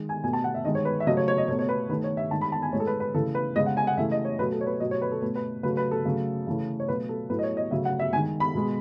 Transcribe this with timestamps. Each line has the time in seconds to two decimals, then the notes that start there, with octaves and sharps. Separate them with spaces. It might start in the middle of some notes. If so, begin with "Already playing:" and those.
Already playing: D#3 G#3
0.09 G#5
0.24 B2 A3 G#5
0.33 A5
0.44 F#5
0.54 E5
0.65 D#3 G#3 D#5
0.75 C#5
0.85 B4
1.00 E5
1.06 C#3 F#3 A3 D#5
1.17 C#5
1.28 C#5
1.38 D#5
1.48 B2 A3 C#5
1.59 C#5
1.69 B4
1.89 D#3 B4
1.93 A3
2.04 C#5
2.17 E5
2.31 D#3 G#3 A5
2.41 B5
2.52 A5
2.62 G#5
2.73 A2 G#3 C#5
2.80 A4
2.87 B4
3.00 B4
3.14 C#3 E3 A3 A4
3.35 B4
3.56 C#3 G#3 D#5
3.66 F#5
3.77 G#5
3.87 F#5
3.97 C#3 E3 A3 E5
4.11 D#5
4.25 C#5
4.39 B2 F#3 A3 B4
4.52 A4
4.61 C#5
4.66 B4
4.80 B2 F#3 A3 D#5
4.91 C#5
5.02 B4
5.12 A4
5.22 B2 A3 B4
5.36 B4
5.63 C#3 F#3 A3 B4
5.77 B4
5.91 A4
6.05 C#3 F#3 A3
6.47 C#3 E3 A3
6.80 C#5
6.88 B2 F#3 A3 B4
7.09 A4
7.30 A2 F#3 A3 B4
7.39 D#5
7.43 C#5
7.57 D#5
7.71 C#3 F#3 A3 E5
7.85 F#5
7.99 E5
8.13 G#3 G#5
8.16 D#3
8.40 B5
8.55 B2 G#3